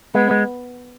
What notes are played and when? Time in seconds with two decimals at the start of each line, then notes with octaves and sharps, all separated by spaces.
0.15 G#3 B3
0.31 G#3